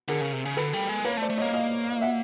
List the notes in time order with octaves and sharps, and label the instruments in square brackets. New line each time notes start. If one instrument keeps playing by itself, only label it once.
[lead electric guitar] D3 [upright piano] G#4 A#4
[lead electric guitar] C#3
C3
C#3
[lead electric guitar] D3 [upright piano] A4 B4
[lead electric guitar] G3
G#3
[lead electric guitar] A#3 [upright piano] B4 C#5
[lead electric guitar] A3
[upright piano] C5 D5
[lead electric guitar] A3
[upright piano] C#5 D#5
[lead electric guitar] A#3
[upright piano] D#5 F5
E5 F#5